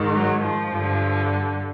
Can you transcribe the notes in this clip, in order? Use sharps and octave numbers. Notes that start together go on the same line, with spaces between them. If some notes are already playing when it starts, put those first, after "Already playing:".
Already playing: G#2 D#3
F#3
F3
G2 D3